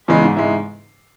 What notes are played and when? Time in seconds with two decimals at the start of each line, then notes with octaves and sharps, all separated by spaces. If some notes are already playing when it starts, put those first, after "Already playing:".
0.08 E2 C#3 E3 G#3
0.23 G#2
0.37 G#3 E4